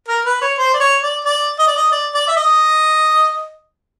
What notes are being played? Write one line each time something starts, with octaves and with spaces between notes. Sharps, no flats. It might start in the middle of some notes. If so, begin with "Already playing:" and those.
A#4
B4
C#5
C5
D5
C#5
D5
D5
D#5
D5
D#5
D5
D5
E5
D#5